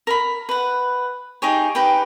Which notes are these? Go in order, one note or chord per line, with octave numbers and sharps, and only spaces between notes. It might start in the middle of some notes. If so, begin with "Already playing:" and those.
A#4 B5
B4 F#5
D#4 G4 G#4 C#5
D#4 G4 B4 G5